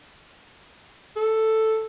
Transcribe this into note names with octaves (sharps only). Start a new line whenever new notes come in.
A4